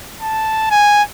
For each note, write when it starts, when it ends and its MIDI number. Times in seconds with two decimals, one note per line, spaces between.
0.22 0.68 81
0.71 1.03 80